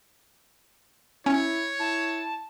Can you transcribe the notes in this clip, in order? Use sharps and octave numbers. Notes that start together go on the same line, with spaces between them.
C#4 E4 C#5 D7
E4 A5